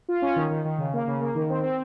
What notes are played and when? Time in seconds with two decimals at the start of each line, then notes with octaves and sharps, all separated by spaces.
0.09 F4
0.22 C#4
0.36 D#3
0.50 D#3
0.65 D#3
0.78 C#3
0.94 A#3
1.08 C#3
1.21 A#3
1.35 D#3
1.50 C4
1.63 C4